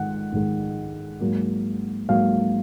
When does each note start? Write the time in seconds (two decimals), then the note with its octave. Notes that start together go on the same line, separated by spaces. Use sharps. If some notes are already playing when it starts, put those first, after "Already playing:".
Already playing: G#2 D#3 G#3 F#5
0.33 G#2 D#3 G#3
1.21 G#2 F#3 A#3
2.09 G#2 F#3 A#3 F5